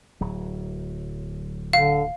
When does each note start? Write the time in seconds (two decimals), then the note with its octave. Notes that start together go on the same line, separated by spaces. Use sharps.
0.21 D1 F#3
1.73 D3 F5